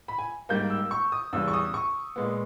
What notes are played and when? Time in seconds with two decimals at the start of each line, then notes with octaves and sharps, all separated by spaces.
0.08 B5
0.18 G#5
0.49 G#2 G3 A#3 G6
0.70 E6
0.91 C#6
1.12 D#6
1.33 E2 C#3 G3 E6
1.48 C#6
1.53 D#6
1.74 C#6
2.16 A#2 G#3 B3